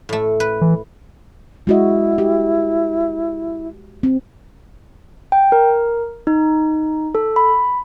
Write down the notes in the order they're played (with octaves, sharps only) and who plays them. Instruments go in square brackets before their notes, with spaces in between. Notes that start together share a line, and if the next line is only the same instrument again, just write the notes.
[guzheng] A2 A3
B4
[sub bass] E3
[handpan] G#3 F#4 D#5 [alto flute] E4
[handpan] G4
C4
[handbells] G5
A#4
D#4
A4
B5